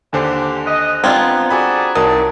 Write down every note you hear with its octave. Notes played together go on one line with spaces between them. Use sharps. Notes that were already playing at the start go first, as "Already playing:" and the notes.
D#2 D3 D4 G4 C5 G#5
D#5 F#6
B3 C4 D4 F4 A#5 G#6
F#4 G#4 A4 D5 G#5 B5
C2 D#3 F#3 A5 D#6